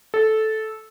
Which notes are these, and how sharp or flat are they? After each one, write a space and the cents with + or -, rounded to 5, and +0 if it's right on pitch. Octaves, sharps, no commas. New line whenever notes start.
A4 -10